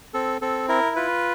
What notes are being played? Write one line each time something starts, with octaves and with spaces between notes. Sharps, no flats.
C4 A4
C4 A4
E4 A#4
F4 B4